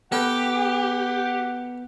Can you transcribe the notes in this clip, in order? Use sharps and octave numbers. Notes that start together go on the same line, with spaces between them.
B3 G4 A4 B4 F#5